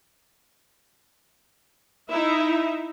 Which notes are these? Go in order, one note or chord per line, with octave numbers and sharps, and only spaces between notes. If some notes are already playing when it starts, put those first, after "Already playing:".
D#4 E4 E5